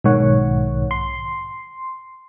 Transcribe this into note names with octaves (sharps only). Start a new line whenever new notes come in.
B1 G#2 D#3 C#5 F#5
C6